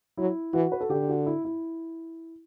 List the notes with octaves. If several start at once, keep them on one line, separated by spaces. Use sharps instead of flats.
F#3 E4
E3 F#4
B4
A4
D3 G4
F#4
E4
E4